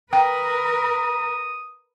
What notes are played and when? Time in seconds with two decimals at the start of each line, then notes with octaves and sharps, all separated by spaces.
0.13 A#4 B4 G5 A#5 D#6